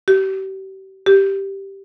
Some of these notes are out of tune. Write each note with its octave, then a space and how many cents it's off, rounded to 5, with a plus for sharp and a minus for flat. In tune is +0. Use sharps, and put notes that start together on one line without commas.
G4 -35
G4 -5